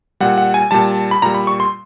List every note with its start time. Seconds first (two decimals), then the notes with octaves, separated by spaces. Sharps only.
0.20 A#2 G3 F#5
0.38 F#5
0.54 G#5
0.71 A#2 G3 A5
1.11 B5
1.22 A#2 G3 A#5
1.34 B5
1.47 C#6
1.60 C6